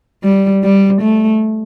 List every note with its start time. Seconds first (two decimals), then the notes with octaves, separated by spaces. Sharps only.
0.24 G3
0.64 G3
1.02 A3